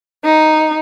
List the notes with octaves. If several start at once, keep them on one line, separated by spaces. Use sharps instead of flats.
D#4